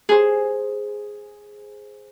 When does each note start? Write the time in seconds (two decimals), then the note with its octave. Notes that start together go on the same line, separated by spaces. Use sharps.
0.09 G#4 C5